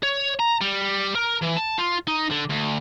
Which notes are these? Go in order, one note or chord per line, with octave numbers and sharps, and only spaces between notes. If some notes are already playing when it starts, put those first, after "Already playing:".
C#5
A#5
G3
A#4
E3
A5
F4
D#4
D3
D2